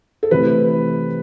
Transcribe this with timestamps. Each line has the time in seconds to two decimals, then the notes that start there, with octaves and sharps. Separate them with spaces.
0.23 A4
0.31 C3 E3 A3 C4 E4 B4